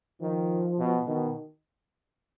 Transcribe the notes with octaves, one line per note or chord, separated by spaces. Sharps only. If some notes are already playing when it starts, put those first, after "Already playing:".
D#3 F3
B2
B2 D#3